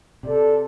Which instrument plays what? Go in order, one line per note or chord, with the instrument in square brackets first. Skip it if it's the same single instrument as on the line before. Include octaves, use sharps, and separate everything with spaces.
[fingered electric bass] C3 [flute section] A4 D5